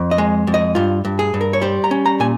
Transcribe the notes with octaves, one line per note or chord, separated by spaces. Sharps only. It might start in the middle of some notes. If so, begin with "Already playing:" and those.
Already playing: F2
D#5
G#3
F2
D#5
G2 F4
G2
G#4
G2
A#4
C#5
G3 C5
A#5
C#4
A#5
A#2 G#5